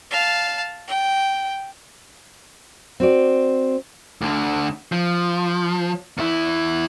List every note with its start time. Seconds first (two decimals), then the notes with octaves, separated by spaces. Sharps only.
0.11 F5 A5
0.88 G5
3.00 C4 F#4 D5
4.21 D2 D3
4.92 F3
6.18 E2 E4